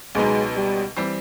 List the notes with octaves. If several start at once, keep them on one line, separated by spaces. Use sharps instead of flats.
C#2 B2 F#3 G#3 B3 D#4
G3
E3 G3 C4